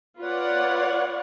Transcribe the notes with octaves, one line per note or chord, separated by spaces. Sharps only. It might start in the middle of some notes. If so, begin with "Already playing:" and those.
F4 B4 C#5 D5 F#5